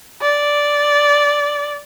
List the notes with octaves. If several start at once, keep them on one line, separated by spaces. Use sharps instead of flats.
D5